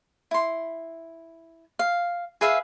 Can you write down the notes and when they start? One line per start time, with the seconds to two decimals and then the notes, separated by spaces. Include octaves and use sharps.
0.31 E4 C6
1.79 F5
2.41 G#4 B4 E5 F5